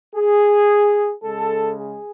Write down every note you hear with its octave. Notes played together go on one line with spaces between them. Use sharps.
G#4
C#3 G#3 A4
G#4